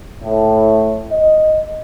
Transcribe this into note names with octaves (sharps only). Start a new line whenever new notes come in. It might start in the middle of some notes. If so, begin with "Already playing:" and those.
A2
D#5